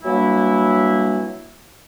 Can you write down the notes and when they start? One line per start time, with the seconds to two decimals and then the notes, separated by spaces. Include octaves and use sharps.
0.03 E3 F#3 G3 A#3 D4 E4